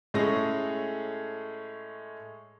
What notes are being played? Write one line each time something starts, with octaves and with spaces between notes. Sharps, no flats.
A2 G#3 C#4 G#4 A4 A#6